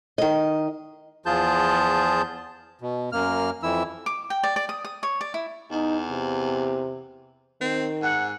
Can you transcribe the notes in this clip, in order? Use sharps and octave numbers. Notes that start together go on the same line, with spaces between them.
D#3 D#5
E2 F3 F4 G#4 A5 G6
B2
F#2 A#3 F6
F2 E3 E4 E6
D6
G5
D5
D5
D#6
D#6
C#5
D5
E4
E2 D#4
C3
D#3 C4
G#2 F#5